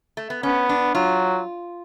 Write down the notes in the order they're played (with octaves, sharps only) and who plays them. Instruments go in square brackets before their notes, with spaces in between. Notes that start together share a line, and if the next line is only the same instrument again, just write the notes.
[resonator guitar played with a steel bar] A3
B3
[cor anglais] B3 [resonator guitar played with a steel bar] C#4
[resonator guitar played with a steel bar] D4
[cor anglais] F#3 [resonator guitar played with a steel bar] F4